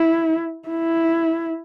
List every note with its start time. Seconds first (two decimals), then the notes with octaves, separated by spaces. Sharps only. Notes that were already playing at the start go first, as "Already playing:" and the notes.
Already playing: E4
0.69 E4